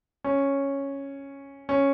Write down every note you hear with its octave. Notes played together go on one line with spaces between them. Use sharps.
C#4
C#4